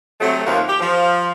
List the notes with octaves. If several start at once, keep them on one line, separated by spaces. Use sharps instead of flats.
C3 F#3 A3
D#2 F3 F#3 A#3
G4
F3